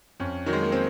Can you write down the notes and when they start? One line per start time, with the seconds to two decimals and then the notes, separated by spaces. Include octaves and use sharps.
0.20 F2 C#4
0.46 D#3 F#3
0.53 G#3
0.63 A#3
0.72 C4